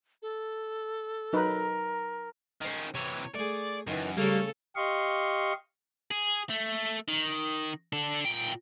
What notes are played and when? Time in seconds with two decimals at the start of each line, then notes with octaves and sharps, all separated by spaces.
0.22 A4
1.33 F#3 D#4 A#4 B4
2.61 D#3 C#4 C5 D#5
2.95 C3 E3 C#5
3.35 A3 G#4 D5
3.87 F#2 D#3 E3
4.17 C#3 G3 A3 A#3 C#4 A4
4.76 G4 D#5 F5 C6 C#6
6.11 G#4
6.50 A3
7.08 D#3
7.93 D4 A4
8.25 A#2 G5